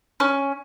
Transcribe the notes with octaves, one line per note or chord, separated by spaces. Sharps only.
C#4